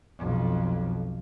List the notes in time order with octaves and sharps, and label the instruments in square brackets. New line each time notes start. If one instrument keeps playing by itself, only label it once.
[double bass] B1 F2